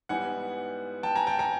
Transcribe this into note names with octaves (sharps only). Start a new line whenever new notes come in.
G#2 E3 G3 B3 F#5 G#5
G5 A5
G#5 A#5
G5 A5
G#5 A#5